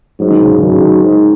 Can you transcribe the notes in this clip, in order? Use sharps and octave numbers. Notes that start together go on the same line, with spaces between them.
G#2 F#3
D#3
C#3
C#3
F#2 D#3
C#3
D#3
G#2